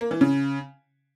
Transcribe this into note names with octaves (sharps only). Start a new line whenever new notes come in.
A#3
E3
C#3